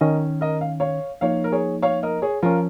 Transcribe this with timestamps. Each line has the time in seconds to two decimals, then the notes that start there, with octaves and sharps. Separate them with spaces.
0.01 D#3 C#4 A#4 D#5
0.41 A#4 D#5
0.61 F5
0.80 C#5 F5
1.21 F3 A#3 D#4 C#5 F5
1.44 A#4
1.52 G#4 C#5
1.82 C#5 F5
2.03 A#4 D#5
2.22 G#4 C#5
2.42 F3 C#4 F4 A#4